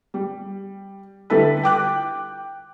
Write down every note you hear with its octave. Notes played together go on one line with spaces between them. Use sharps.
G3
D3 G3 E4 A4 B4
G5 D6 F#6